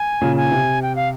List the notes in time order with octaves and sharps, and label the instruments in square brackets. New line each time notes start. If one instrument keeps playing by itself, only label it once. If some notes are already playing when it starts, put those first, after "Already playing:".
Already playing: [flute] G#5
[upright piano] A#2 C#3
[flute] G#5
[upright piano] C3
[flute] G5
F5